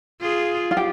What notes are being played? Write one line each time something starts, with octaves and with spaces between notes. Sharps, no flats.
F4 G#4
F4
G4